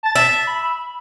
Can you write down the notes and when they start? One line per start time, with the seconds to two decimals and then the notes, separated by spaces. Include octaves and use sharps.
0.03 A5 A6
0.15 E5
0.47 B5